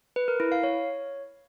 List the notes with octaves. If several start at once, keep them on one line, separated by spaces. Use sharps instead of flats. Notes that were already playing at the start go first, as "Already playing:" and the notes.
B4
A#4
E4
F5
C#5